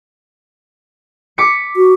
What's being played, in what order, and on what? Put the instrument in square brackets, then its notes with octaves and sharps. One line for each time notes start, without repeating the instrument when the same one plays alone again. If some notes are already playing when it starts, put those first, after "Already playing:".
[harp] D6 B6 C#7
[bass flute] F#4